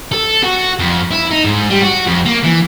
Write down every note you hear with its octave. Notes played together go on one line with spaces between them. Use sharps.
A4
F#4
F2
E4
D#4
G#2
G3
F#4
F2
A#3
E3